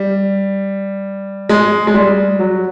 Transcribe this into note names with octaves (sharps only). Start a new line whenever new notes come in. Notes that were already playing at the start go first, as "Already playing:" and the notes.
Already playing: G3
G#3
G#3
G3
F#3